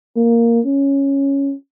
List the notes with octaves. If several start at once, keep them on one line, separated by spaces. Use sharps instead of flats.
A#3
C#4